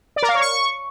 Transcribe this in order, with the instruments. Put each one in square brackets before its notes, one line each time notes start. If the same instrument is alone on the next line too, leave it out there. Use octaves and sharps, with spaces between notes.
[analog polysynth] D5
A#4
F5
C#5
C#6